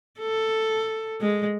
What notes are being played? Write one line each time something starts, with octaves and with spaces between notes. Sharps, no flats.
A4
G#3